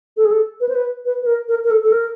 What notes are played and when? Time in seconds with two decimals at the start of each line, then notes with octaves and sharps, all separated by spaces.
0.17 A4
0.25 G#4
0.31 A4
0.60 B4
0.69 C5
0.75 B4
1.05 B4
1.22 B4
1.26 A#4
1.48 A#4
1.64 A#4
1.71 A4
1.83 A4
1.92 A#4